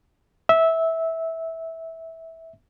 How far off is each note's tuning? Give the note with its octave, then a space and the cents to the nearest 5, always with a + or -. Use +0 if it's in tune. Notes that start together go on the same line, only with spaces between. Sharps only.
E5 -15